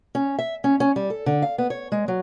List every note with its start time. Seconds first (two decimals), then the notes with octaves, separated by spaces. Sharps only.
0.15 C#4
0.39 E5
0.64 C#4
0.80 C#4
0.96 G3
1.10 A4
1.26 D3
1.42 F5
1.58 B3
1.70 C#5
1.92 G#3
2.08 F#3